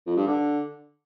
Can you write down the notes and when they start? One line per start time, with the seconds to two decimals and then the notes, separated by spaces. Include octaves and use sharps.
0.06 F2
0.17 G2
0.27 D3